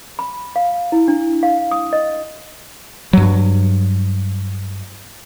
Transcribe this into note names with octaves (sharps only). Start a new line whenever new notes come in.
B5
F5
E4
D4
F5
D#6
D#5
G2 F#3